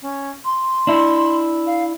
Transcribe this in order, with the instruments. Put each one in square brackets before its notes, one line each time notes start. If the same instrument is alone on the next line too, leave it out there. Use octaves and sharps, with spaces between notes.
[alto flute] C#4
C6
[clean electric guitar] D4 E4
[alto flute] F5